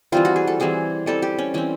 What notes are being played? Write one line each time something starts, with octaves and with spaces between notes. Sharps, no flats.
E3 G3 C4 F4
F#4
G#4
A4
E3 G3 C4 G#4
E3 G3 C4 A4
G4
C#4
E3 G3 C4 C#4